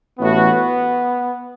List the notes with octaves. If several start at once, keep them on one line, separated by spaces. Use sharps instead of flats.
A1 A2 A3 B3 F#4